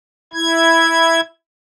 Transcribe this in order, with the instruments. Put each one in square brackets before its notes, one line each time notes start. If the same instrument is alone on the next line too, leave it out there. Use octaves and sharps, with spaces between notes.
[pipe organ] E4 G#6